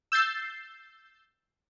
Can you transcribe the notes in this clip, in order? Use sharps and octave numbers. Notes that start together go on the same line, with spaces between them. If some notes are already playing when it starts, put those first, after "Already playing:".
E6 G6 A6 C7